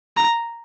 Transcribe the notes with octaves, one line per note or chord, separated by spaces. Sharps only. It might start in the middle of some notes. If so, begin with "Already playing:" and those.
A#5